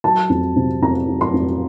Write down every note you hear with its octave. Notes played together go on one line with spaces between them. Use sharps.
F#3 A5
F2
C3
F2 A#5
F#3
C6
F2